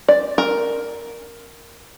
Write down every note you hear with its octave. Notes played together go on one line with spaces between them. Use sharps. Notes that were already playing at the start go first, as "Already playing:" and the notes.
D5
A#4